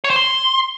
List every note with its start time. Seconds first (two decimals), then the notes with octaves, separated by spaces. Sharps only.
0.04 C#5
0.10 C5
0.16 C6